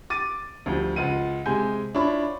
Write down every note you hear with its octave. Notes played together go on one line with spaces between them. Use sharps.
D6 A6 D#7
D2 F3 G3
C#2 F4 F#5 D#7
C3 G#3 G#5 G6
D4 E4 F4 C#5 B5